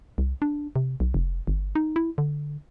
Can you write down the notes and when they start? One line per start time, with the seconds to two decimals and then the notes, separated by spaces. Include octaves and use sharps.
0.18 C2
0.42 D4
0.76 C3
1.00 B1
1.14 F1
1.47 G1
1.75 D#4
1.96 E4
2.18 D3